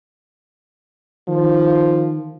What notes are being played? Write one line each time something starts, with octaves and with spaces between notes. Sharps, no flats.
D#3 F3